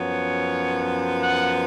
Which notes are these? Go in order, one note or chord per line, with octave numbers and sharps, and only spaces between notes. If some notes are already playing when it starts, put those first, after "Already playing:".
Already playing: F#2 F3 B3 C#5
F#5